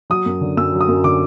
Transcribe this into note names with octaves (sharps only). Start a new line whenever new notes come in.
F#3 D#6
F#2
D3
F#2 E6
F#3
D#6
F#2
D3 D6